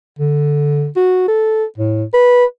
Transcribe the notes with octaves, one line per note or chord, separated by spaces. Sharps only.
D3
F#4
A4
A2
B4